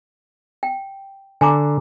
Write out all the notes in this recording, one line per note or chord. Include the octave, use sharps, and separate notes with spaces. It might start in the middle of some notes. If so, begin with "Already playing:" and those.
G5
D3 G#5 A#5 D6